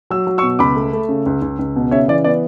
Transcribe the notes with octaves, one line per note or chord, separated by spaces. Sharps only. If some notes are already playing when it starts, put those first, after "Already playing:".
F#3 E6
F#3
C#6 E6
B2
C#2 B5 D6
A3
A3
C#3
C#2
C#2
C#2
B2
C#3 C#5 E5
E3 D5
B3 D5